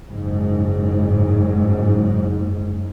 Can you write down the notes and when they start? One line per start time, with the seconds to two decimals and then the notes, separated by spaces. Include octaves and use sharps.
0.10 F#1 G#2